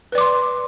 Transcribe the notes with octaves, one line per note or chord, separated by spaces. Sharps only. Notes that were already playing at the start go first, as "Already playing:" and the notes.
B4 D5 C6 D6